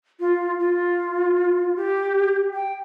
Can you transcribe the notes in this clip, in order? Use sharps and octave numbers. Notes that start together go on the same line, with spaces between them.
F4
F4
G4
G5